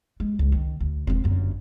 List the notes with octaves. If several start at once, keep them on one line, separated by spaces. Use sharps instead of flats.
G#3
C#2
D#3
D2
E1 C4
G1 F#2